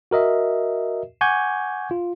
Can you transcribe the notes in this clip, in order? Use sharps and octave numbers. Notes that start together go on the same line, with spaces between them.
F#4 A#4 D#5 E5
F#5 G#5 C#6 D6 G6 G#6
F4